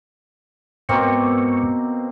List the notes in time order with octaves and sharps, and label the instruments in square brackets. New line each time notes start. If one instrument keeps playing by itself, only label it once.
[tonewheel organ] G#2 C#6 [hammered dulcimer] B2 A#3 C4